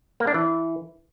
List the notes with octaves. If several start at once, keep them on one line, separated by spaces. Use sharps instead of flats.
A#3
D4
E3